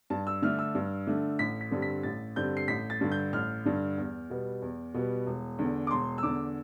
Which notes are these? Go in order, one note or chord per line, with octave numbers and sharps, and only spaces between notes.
G2 A5
E6
D3 A3 D4 F6
E6
G2
D3 A3 D4
A1 B6
B6
G2 D3 G3 C4
B6
A1 A6
G2 D3 G3 C4 G6
C7
A1 B6
A6
G2 D3
G6
A1 F6
G2 D3
E2
B2 G3 B3
E2
B2 G3 B3
E1
E2 D3
D6
E1 C6
E6
E2 D3 D6